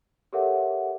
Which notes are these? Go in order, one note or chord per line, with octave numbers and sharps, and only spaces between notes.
G4 A4 A#4 C#5 E5 F#5